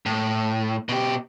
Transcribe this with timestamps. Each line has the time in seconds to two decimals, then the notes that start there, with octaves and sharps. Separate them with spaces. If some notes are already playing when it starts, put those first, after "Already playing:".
0.06 A2
0.89 B2 G4